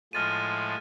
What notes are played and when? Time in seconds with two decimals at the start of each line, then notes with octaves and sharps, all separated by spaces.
0.13 A2 F3 G#3 F6 A6 D#7